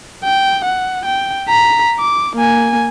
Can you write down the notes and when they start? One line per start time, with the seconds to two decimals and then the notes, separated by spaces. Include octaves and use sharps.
0.24 G5
0.64 F#5
1.05 G5
1.49 A#5 B6
1.99 D6
2.36 A#3 G#5